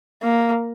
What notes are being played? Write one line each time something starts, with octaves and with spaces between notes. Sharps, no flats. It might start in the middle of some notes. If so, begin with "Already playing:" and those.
A#3